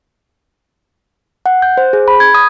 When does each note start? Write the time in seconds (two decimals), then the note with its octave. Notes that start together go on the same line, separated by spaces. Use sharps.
1.46 F#5
1.62 G6
1.77 C5
1.93 G#4
2.08 B5
2.20 G#6
2.35 D#6